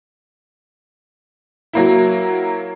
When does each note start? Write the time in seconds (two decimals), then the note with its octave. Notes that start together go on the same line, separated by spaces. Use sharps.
1.73 F#3 A#3 E4